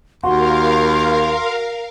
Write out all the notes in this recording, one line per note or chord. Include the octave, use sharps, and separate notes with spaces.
D#2 F#4 A#4 F5 C6